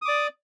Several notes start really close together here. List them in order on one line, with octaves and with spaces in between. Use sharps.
D#6 D6 D5